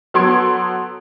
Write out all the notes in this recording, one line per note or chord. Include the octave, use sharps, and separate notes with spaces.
F#3 B3 A4 C6 G#6 D7